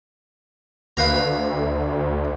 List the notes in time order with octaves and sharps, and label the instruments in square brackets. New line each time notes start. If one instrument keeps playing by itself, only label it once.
[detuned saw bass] D2 [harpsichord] B4 F5 A#5